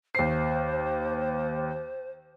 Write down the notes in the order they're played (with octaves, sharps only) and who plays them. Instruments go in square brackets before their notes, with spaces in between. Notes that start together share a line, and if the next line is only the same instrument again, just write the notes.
[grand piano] D#2 C7 [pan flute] C5